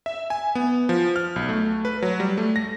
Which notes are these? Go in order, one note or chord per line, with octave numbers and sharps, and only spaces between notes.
E5
G#5
B3
F3
F6
B1
A3
B4
F#3
G3
A3
A#6